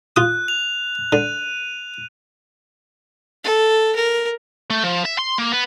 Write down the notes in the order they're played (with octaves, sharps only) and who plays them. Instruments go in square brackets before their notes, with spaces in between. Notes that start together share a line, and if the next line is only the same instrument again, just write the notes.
[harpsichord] F4 D#6 [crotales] F#6
[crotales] F7
[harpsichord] D3 [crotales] D#7
[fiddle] A4
A#4
[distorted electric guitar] A3
F3
E5
C6
A#3
B3